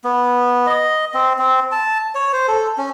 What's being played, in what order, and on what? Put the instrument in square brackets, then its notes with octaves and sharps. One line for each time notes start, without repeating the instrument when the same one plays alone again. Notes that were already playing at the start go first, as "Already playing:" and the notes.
[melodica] B3
D#5
C4
C4
A5
C#5
C5
A4
C#4